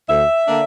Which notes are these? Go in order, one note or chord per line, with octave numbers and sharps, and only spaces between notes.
D2 E5
D3 A#3 D4